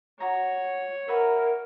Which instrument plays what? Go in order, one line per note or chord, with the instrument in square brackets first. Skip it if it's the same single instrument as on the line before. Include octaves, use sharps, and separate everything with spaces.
[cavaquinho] F#4 A#5 [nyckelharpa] C#5
[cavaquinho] F#4 B4 E5 [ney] A#4